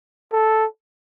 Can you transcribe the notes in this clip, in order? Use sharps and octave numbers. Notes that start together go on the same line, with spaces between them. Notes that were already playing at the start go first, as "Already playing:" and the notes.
A4